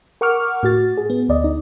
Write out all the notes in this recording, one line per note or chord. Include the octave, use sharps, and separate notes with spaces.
A#4 F#5 C#6 D6 F6
A2 F#4 A6
G#4
B3
D2 D5 D#5
D#4